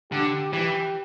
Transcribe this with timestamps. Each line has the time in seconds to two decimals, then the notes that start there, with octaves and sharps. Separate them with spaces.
0.12 D3 G4
0.53 E3 G4